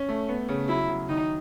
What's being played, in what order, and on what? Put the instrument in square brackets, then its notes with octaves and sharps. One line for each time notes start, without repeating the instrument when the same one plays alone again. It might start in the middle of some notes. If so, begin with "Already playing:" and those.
Already playing: [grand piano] C#4
A3
B3
C#3
[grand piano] F#3 [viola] E4
[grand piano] F#3
[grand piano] D#3 [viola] D#4